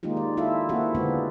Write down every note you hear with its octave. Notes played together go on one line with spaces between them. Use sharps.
D#3 G#3 A#3 D#4 F4 G4
D5
E4 F4 A4 E5 F5
A#3 C4 E4 F#4 G#4
D3 G#3 B3 C4 D4 F4